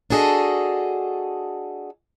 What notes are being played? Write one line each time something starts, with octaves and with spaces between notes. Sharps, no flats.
D4 F#4 G#4 A4 D#5